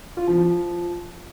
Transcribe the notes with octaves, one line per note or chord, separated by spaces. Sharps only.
F4
F3
F3